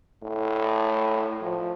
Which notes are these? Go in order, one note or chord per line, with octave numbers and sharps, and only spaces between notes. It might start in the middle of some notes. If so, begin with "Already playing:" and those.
A2
F3